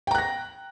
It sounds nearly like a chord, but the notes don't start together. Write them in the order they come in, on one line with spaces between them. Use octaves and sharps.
G5 A#5 F#6 A#6